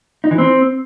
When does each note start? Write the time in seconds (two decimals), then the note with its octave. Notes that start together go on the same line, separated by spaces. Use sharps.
0.24 D#4
0.31 E3
0.38 C4